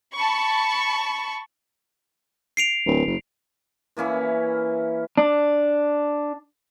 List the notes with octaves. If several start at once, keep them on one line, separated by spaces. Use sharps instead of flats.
A5 B5 C#6
C7 D7 F7
D1
F#1
E3 A#3 C#4 E4
D4